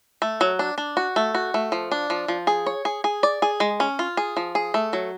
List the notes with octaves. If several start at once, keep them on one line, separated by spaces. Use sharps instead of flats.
A3
F#3
D4
D4
F#4
A3
F#4
A3
F3
D4
F3
F3
G#4
C#5
G#4
G#4
D5
G#4
G#3
C#4
F4
G#4
F3
G#4
A3
F#3